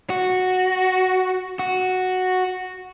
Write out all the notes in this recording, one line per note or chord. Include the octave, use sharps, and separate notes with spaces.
F#4
F#4